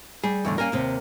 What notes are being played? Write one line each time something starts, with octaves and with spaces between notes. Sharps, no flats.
G3 G#4
E2 A2 D3
G3 A#3 C#4 A#4 G#5
D#2 C3 C5